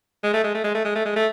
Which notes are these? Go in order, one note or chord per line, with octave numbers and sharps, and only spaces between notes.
G#3
A3
G#3
A3
G#3
A3
G#3
A3
G#3
A3